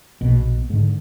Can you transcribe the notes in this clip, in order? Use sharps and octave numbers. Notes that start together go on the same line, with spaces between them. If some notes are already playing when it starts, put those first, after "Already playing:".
A#1 B2
G#2 D3